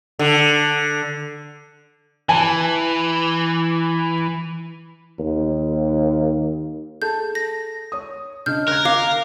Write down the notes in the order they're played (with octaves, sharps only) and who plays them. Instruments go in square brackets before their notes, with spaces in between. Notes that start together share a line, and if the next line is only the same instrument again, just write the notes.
[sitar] D3
[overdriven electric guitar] E3 [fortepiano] G#5 A5
[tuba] D#2
[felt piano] G#4 A4 A5 [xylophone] G6
[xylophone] A#6
[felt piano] C#5 D#6
[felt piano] C#3 D4 D#5 [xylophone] F6 G6
[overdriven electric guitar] A#4 [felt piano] F#6 G#6
[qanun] F5 [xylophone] D6